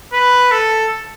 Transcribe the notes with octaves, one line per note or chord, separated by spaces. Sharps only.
B4
A4